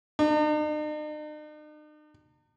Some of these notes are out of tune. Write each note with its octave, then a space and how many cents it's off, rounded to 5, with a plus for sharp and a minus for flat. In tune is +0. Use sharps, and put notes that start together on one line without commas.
D#4 -45